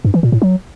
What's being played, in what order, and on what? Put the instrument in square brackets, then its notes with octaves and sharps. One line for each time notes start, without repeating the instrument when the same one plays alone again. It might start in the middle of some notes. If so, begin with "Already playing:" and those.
[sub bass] G2
E3
A#2
A2
F#3